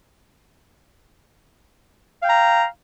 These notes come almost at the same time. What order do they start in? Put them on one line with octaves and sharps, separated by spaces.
F5 G5 A#5